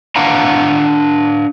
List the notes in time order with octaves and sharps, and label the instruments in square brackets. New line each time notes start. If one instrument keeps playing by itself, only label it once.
[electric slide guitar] D4 F5 F#5 A#5